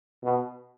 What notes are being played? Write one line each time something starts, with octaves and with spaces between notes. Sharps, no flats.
B2